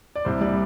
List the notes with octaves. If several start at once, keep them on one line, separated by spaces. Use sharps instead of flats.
D5
C2 C5
G3 D5